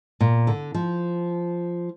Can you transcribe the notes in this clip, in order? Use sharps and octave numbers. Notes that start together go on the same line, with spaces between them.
A#2
D3
F3